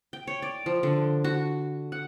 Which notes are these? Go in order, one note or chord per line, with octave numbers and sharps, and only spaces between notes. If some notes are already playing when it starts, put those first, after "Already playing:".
G5
C#5
D5
F3
D3
F#4
F#5